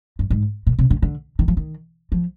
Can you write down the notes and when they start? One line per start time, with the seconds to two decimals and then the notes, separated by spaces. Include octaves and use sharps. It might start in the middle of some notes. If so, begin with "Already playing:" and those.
0.19 G2
0.30 G#2
0.67 A#2
0.79 C3
0.90 D3
1.02 D3
1.39 D#3
1.48 F3
1.57 D#3
2.12 F3